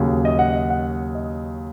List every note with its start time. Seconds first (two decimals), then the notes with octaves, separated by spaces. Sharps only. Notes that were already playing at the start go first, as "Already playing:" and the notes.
Already playing: D#2 C#3 F#3
0.25 D#5
0.39 F#5
0.53 D#5
0.70 F#5
1.15 D#5